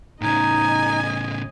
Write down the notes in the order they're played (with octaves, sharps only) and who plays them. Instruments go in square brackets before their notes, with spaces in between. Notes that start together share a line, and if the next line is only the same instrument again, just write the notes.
[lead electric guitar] A2 C#3 [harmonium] D#4 [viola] D#5 G#5